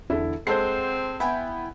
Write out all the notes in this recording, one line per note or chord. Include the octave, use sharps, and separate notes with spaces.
E2 D3 E4 A4
G#3 C4 A4 C5 F#5 C6 C7
B3 E4 G5 G#5